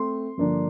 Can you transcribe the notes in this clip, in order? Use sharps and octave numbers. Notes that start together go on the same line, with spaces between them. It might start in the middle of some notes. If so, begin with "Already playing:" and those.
Already playing: A3 C4 C6
G2 D3 F3 A#3 D4